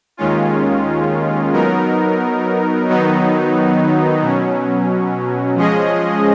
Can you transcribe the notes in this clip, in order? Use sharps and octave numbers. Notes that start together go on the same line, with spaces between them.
D#2 D#3 G#3 C#4 F4
F#3 B3 D#4 A#4
D#3 F#3 B3 D#4
B2 F#3 C#4
F3 G#3 C#4 G#4 D#5